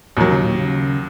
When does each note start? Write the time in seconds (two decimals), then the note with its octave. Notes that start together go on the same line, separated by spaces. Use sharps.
0.17 D#2 A#2 D#3 F#3
0.30 C#3
0.44 A#2
0.59 C#3